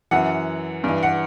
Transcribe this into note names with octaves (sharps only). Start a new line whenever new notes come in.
F#2 E3 F#5
G2 E3
F#5